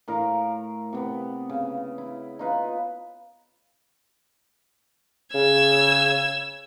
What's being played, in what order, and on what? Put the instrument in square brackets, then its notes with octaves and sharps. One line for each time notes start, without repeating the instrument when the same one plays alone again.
[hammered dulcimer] A2 A#4 F5 A#5
C3 B3
C#3
E4
D#4 F4 B4
[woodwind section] C#3 [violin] E6 G#6